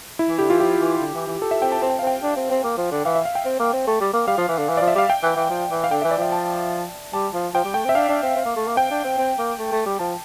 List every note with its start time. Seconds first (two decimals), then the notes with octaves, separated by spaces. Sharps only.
0.19 E4
0.28 E3
0.39 D3 G4
0.49 E3 F4
0.59 F3 G4
0.80 E3
1.01 D3
1.14 E3
1.27 E3
1.42 A4
1.51 E5
1.62 C4 G5
1.72 A5
1.82 C4 A5
1.90 G5
1.99 F5
2.02 C4 G5
2.23 D4
2.36 C4
2.50 C4
2.64 A#3
2.77 F3
2.91 D3
3.05 E3 F5
3.15 E5
3.25 F5
3.35 G5
3.45 C4
3.59 A#3
3.73 C4
3.87 A3
4.01 G3
4.13 A#3
4.27 G3 F5
4.37 F3
4.48 E3
4.58 D3
4.68 E3
4.77 F3 D5
4.87 E5
4.95 G3 F5
5.10 G5
5.23 E3
5.36 E3
5.50 F3
5.71 E3
5.84 F5
5.91 D3 G5
6.01 E3 E5
6.11 D5
6.18 F3 E5
6.32 A5
7.13 G3 A5
7.34 F3
7.54 F3 G5
7.65 G3
7.74 A3 G5
7.85 C4
7.89 E5
7.95 D4 F5
8.09 D4
8.23 C4
8.36 C4
8.46 A#3
8.56 A3
8.67 A#3
8.77 C4 G5
8.90 D4
9.04 C4
9.18 C4
9.38 A#3
9.59 A3
9.72 A3
9.86 G3
9.99 F3 A5